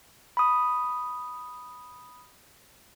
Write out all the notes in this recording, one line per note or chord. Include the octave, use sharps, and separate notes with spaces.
B5 D#6